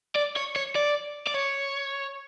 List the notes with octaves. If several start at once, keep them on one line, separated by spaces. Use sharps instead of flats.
D5
C#5
C#5
D5
D5
C#5